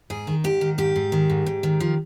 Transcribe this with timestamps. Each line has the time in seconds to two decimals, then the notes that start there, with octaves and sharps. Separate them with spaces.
0.10 G#2 G#4
0.27 D#3
0.44 G#2 G4
0.61 D#3
0.78 G#2 G4
0.96 G#2
1.12 D#3
1.30 G#2
1.46 G#2
1.63 D#3
1.80 F3